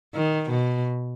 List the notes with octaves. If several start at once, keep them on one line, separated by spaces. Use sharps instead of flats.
D#3
B2